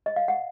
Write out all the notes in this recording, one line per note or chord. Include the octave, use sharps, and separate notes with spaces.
D#5
F5
F#5